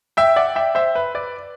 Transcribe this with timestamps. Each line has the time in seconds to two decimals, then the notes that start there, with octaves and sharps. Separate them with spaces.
0.17 E5 G5
0.36 D5 F#5
0.56 E5 G5
0.75 C5 E5
0.95 B4
1.15 B4 D5